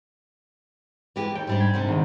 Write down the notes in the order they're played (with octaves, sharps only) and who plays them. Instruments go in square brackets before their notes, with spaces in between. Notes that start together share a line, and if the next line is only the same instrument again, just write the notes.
[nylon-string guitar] E3 G#3 G4
[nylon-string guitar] D#2 [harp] G5
[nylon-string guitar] G#2 G3 D4
[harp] G5 G#6 B6
[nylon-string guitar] G#2 C3 D4
[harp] G#1 D#3